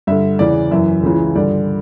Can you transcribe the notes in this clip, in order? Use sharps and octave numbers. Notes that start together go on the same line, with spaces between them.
G2 D3 E5
E2 C#3 E3 D5
F#2 E3 E5
C#2 C#3 E3
G2 D3 D5